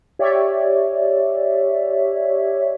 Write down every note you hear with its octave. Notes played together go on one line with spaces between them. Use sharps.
G4 C#5 D5 E5